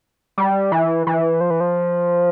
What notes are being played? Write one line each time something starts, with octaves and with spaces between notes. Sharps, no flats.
G3
E3
E3
F3
E3
F3